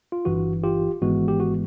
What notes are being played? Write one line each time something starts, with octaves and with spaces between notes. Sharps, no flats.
F4
G1 G2 E3 F#4
F4 G4
G#1 G#2 E3 G#3 B3 F#4
G4
F#4